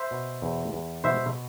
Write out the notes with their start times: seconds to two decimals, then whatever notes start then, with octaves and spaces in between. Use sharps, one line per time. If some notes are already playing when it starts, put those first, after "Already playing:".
Already playing: C5 E5
0.11 B2
0.42 E2
0.73 E2
1.04 B2 C5 E5